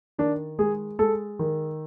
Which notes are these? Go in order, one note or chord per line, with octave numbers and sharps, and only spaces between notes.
D#3 D4
G#3 G#4
G#3 A4
D#3